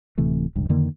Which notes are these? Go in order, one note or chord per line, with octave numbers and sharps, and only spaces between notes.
D1 C3 E3 A3
E1 C#2 G2
F2 D3 D#3 A#3